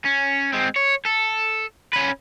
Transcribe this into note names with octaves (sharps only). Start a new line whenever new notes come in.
C#4
G#3 C4
C#5
A4
C#4 B4